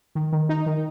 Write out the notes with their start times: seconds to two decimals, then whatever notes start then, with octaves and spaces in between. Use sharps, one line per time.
0.15 D#3
0.32 D#3
0.49 D#4
0.66 D#3